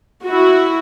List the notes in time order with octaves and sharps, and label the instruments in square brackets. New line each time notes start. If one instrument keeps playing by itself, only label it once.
[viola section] E4 F#4